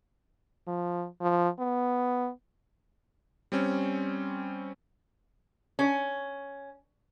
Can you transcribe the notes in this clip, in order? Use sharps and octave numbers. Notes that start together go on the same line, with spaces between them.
F3
F3
B3
G3 C4 C#4
C#4